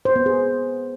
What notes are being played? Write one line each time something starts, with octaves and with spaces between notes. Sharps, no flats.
C5
B3
G#4